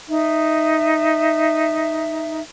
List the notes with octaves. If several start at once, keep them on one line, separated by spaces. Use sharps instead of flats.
D#4 E5